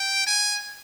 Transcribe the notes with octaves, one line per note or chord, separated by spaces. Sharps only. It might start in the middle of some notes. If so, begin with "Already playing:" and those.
Already playing: G5
G#5